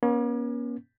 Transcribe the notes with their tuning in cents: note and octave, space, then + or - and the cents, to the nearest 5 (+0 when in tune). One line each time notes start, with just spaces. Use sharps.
A#3 +45 C#4 +0